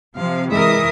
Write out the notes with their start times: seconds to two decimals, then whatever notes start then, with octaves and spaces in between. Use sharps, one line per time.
0.16 C3 F3 F5
0.51 E3 G#3 A#4 E5 D#6